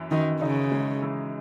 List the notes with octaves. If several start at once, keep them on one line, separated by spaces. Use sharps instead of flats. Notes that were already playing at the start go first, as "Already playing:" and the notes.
Already playing: F#2 E3
F#2 D#3
C#3 D#4
G#3
E3